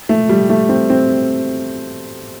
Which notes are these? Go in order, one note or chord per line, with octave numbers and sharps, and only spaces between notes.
A3
G3
A3
C4
C4